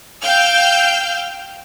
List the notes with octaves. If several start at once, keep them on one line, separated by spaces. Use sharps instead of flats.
F5 G5 E6 F6 G6